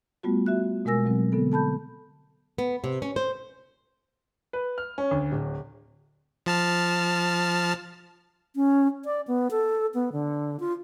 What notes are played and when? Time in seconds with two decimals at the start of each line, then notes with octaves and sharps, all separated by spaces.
0.23 G3 A3 B3 F4 F#4
0.46 F#4 E5 F#6
0.85 B2 G#3 A#4 G#5 E6 A#6
1.05 B2 F#3 C4
1.32 D3 B3 A4
1.52 A4 A5 B5 G6
2.58 B3
2.84 C3
3.02 C#4
3.16 C5
4.53 B4
4.78 F6
4.98 C#4
5.11 D2
5.32 D1
6.46 F3 A5 F6
8.56 C#4
9.05 D5
9.27 B3
9.51 A4
9.94 B3
10.12 D3
10.60 F4